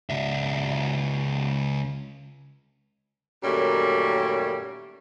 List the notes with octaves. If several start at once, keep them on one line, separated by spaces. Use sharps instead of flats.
C#2 E5
F#2 A#2 D#3 G3 A3 C#5